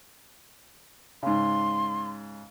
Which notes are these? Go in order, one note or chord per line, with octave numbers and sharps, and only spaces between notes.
G#2 C#3 C6